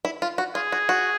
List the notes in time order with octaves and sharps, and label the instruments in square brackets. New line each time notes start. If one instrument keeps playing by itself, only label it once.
[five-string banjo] E4
F4
F#4
[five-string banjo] F4 [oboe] G#4
[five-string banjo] F#4
F#4